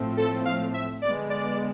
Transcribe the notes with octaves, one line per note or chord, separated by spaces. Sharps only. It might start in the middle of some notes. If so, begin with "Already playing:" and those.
Already playing: A2 F3 A3 C4
A4
F5
E5
D3 G#3 B3 D5
D5